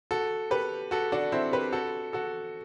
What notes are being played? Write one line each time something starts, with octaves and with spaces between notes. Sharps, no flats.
F#4 A4
G4 B4
F#4 A4
D4 F#4
C4 E4
G4 B4
F#4 A4
F#4 A4